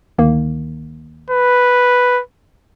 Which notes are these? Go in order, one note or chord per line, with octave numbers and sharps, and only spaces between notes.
D2 D#3 A#3
B4